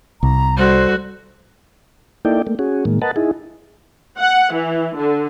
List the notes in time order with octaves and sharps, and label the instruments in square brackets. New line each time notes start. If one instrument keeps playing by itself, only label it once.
[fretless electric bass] C2 [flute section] A#5
[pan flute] G3 [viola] F#4 A4 [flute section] C5
[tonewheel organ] A#3 D#4 E4 A4 D5 G5
A3 A#3
C#4 F#4 G#4
A2 D#3 G#3 A#3
A#4 B4 D#5 F#5 A5
D#4 E4 G#4
[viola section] F#5
E3
D3